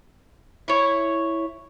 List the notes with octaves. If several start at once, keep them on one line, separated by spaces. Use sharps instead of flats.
E4 C#5